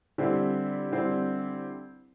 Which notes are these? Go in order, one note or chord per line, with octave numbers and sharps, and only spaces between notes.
D3 G3 C4 E4
D3 G3 C4 E4